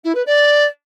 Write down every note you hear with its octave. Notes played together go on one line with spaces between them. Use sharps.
E4
B4
D5